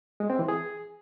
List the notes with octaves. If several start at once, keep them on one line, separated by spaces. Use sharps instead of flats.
G#3
C4
E3
G#4